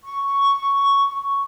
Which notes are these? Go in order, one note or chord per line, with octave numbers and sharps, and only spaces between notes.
C#6